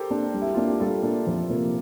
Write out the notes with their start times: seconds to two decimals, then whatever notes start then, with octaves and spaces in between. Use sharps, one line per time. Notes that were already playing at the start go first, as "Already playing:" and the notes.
Already playing: G4 A4 A#4 C5
0.10 A#3 D4
0.34 G3
0.42 E4
0.54 A#3 D4 F4
0.67 G4
0.80 G3 F4 A4
1.03 A#3 D4
1.27 F2
1.50 C3 F3 A#3